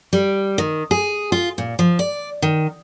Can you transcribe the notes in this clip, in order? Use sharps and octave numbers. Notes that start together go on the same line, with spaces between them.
G3
D#3
G#4
F4
A#2
F3
D5
D#3